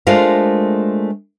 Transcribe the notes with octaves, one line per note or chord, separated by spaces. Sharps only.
G#3 A3 D4 F4 A#4 C5